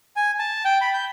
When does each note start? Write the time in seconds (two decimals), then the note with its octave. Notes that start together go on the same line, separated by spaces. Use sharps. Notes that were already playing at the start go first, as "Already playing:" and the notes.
0.16 G#5
0.39 A5
0.65 G5
0.81 B5
0.94 G6